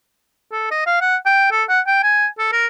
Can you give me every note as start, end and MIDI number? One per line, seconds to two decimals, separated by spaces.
0.52 0.68 69
0.71 0.83 75
0.86 1.01 77
1.01 1.16 78
1.26 1.51 79
1.52 1.64 69
1.69 1.81 78
1.87 2.01 79
2.03 2.27 80
2.39 2.48 69
2.52 2.67 70